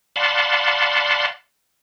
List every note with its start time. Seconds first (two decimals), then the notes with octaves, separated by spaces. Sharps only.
0.16 D5 F5 F#5 A5 B5 C6